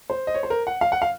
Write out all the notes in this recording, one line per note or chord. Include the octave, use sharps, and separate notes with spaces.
C5
D#5
C#5
C5
A#4
F#5
F5
F#5
F5